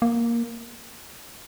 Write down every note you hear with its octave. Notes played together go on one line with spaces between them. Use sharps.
A#3